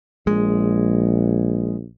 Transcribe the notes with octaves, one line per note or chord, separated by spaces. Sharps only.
A#1 G#3